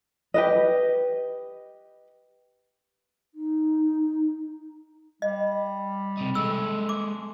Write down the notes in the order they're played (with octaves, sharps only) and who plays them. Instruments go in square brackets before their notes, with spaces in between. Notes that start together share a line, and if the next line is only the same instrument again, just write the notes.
[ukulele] G4 B4 D#5
[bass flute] D#4
[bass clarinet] G3 [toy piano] D#5
[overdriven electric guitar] C3 D#4
[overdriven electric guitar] G#3 A4 [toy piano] E6
[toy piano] D6